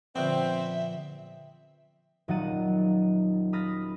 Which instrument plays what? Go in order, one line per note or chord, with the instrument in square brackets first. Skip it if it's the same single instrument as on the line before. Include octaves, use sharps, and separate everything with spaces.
[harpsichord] A#1 B3 [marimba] D3 G5 [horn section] C4 [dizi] E5
[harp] D#1 F#3 D#4 F#5 A6 D#7
B5 D#6 F6 A6 A#6